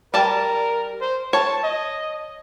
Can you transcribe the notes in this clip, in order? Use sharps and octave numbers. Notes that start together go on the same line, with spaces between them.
G3 A#4 D5 A5
C5
C#5 A5
D#5